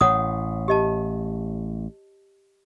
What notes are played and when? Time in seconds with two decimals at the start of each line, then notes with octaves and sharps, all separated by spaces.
0.01 A1 A2 C#5 F#5 D#6
0.68 G4 D#5 A5